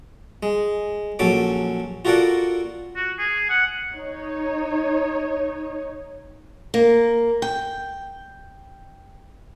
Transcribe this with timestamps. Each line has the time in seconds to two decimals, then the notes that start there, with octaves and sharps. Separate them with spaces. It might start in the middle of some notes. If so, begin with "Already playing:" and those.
0.43 G#3
1.19 A#1 F#3 C#4 A4 D6
2.05 F4 F#4 A4 A#4 D5 F#5
2.96 F#4
3.19 G#4
3.50 F#5
3.95 D#4 C#5
6.74 A#3
7.42 G5